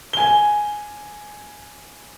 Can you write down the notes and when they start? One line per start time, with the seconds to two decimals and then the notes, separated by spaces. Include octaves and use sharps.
0.13 G#5 G7